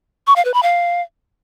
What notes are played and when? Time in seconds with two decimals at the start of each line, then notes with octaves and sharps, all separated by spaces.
0.27 C#6
0.36 F5
0.45 B4
0.54 B5
0.63 F5